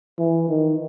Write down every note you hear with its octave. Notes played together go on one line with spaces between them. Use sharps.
E3
D#3